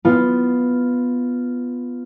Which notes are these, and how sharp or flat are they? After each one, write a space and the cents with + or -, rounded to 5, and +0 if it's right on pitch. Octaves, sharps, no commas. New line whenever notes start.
B3 +0 F4 +0